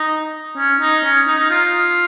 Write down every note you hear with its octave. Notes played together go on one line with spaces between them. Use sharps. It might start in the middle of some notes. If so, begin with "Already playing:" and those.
Already playing: D#4
C#4
D#4
C#4
D#4
D#4
F4